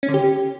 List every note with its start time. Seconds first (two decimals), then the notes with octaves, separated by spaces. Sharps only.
0.03 C#4
0.08 D3
0.14 G4